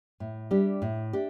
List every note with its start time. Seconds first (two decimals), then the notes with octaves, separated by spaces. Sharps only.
0.20 A2
0.51 G3 D4 G4
0.82 A2
1.13 D4 G4